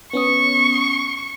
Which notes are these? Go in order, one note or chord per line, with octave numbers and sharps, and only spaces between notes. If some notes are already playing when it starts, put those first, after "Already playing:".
B3 C#4 C#6 D#6